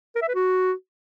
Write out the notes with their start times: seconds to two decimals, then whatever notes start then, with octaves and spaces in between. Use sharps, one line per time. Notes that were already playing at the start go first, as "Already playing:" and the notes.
0.15 A#4
0.22 E5
0.28 B4
0.35 F#4